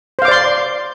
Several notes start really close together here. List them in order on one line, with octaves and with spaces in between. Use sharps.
C5 F5 D6 D5 C6